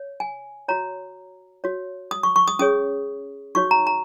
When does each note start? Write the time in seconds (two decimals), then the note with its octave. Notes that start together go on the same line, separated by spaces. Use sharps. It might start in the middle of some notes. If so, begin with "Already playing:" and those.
Already playing: C#5
0.20 G#5
0.68 F#4 C#5 A#5
1.64 F#4 C#5
2.11 D#6
2.23 C#6
2.36 C#6
2.48 D#6
2.59 C#4 G#4 C#5 D#6
3.55 D#4 F#4 C#5 C#6
3.71 A#5
3.87 A#5